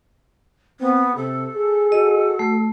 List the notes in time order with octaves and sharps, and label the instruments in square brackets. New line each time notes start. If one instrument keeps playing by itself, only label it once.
[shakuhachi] B3 [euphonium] C4
[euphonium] C3 [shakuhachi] A4
[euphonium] G#4
[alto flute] F#4 [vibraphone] D#5
[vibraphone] A3